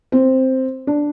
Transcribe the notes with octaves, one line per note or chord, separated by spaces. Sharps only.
C4
D4